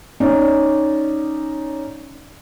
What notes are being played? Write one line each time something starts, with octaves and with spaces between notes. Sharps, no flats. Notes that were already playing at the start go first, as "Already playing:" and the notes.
C#4 D#4 D5